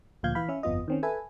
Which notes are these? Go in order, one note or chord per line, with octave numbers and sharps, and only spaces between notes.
D2 A#2 F3 F5 G6 G#6
E3 F5 B5
C#4 E5
G1 F2 B3 F4 D#5
D#3 C4 C#4
A4 B4 E5 G#5